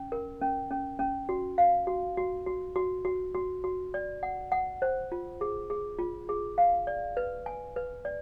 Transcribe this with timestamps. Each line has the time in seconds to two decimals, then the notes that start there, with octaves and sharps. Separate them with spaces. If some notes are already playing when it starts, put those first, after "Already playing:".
Already playing: C#4
0.12 A#4
0.41 C#4
0.71 C#4
0.99 C#4
1.29 F#4
1.58 F5
1.87 F#4
2.17 F#4
2.47 F#4
2.76 F#4
3.05 F#4
3.34 F#4
3.64 F#4
3.94 D5
4.23 F#5
4.52 F#5
4.82 C5
5.12 F4
5.41 G#4
5.70 G#4
5.99 F4
6.29 G#4
6.58 F5
6.87 D5
7.17 B4
7.46 G#5
7.76 B4
8.05 D5